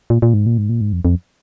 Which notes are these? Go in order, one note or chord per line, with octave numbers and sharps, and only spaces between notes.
A#2
A#2
G#2
A#2
G#2
A#2
G#2
F2
F2